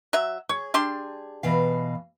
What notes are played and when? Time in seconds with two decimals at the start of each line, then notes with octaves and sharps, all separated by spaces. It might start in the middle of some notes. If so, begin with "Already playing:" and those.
0.13 F#3 E5
0.49 G#4 C#5
0.74 G3 D4 C6
1.43 B2 E3 F5